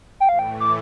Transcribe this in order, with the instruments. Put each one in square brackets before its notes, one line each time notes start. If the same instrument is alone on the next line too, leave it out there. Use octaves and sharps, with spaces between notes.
[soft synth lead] G5
[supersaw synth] A2 E3 A3 [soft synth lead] F5
[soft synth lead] G5
D6